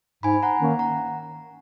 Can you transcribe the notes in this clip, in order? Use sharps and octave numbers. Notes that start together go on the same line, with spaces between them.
G#2 G#5 B5
F#5 A#5
D#3 A#3 C#4
F#5 A#5